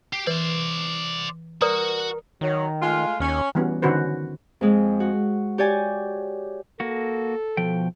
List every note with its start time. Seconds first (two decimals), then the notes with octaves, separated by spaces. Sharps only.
0.13 G4 C7
0.27 E3 B4 C5 D5
1.61 F#4 A#4 B4 D5 D#6
2.41 D#3 F#3
2.80 G#3 A3 F4
3.20 D#2 C#4
3.55 E3 G3 B3 C#4 F#4
3.82 D3 D#3 C#4 F#4 B4 C5
4.61 F2 G#3
5.00 F#4
5.58 G4 C#5 D5 G#5
6.80 A#3 F#4 A4
7.57 B2 F3 G5